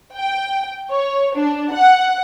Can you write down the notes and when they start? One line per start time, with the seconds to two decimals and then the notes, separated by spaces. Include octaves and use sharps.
0.17 G5
0.91 C#5
1.36 D4
1.73 F#5